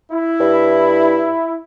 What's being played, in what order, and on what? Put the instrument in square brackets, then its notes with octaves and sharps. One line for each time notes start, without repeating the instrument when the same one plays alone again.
[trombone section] E4
[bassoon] G2